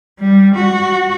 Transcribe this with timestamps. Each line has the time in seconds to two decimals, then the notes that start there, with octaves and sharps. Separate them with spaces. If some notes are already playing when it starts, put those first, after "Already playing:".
0.19 G3
0.55 F#4